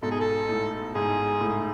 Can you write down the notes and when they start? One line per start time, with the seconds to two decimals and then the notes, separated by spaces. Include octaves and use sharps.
0.02 G#2 B2 A4
0.11 G#4
0.20 A4
0.49 A2
0.94 G#2 G#4
1.41 A2